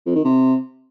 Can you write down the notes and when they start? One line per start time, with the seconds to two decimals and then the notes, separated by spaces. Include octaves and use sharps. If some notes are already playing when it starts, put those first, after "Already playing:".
0.06 F2
0.15 D#3
0.24 C3